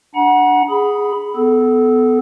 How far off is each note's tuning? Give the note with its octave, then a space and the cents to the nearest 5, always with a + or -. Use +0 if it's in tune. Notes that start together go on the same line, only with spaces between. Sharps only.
D4 +0 F#5 +0 A#5 +45
G#4 +0 B5 +0
B3 +20 A4 -20